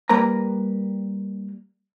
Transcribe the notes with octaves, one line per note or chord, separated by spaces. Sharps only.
G3 A#3 A#4 B4 A#5